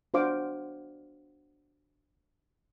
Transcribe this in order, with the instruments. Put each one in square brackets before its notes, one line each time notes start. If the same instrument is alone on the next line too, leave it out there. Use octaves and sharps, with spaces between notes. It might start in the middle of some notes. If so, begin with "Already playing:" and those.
[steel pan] D4 F#4 C5 F5 D6